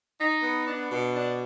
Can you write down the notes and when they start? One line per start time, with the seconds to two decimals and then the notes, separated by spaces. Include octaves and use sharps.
0.18 D#4
0.42 B3
0.67 D4
0.91 B2
1.15 D4